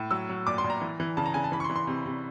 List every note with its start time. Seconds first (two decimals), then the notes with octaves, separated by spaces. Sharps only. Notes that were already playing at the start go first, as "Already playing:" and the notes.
Already playing: A2
0.11 F#3 E6
0.29 F#3
0.47 A#2 D6
0.58 C6
0.64 A#2
0.70 A#5
0.81 E3
1.00 E3
1.17 C#3 A5
1.26 A#5
1.34 C#3 G#5
1.44 A5
1.52 E3 B5
1.60 C#6
1.64 C6
1.70 E3
1.76 C6
1.87 C3
2.05 C3